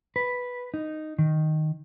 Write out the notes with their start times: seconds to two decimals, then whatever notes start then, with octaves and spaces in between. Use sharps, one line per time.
0.16 B4
0.74 D#4
1.19 D#3